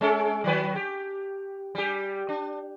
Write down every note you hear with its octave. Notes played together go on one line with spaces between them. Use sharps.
G#3 C#4 A4
D#3 F#3 B4
G4
G3 G4
D4